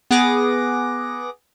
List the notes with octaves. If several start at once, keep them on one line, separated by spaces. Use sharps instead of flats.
B3 G#4 F#5 D6 A#6